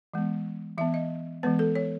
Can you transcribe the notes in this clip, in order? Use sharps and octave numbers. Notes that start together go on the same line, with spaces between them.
E3 G#3 B3
E3 B3 E5
D#5
E3 G#3 B3 B4
A4
C#5